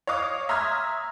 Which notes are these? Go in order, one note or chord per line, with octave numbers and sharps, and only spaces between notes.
C#5 D#5 F5 D6 D#6
E5 A#5 C6 D#6 F6 G#6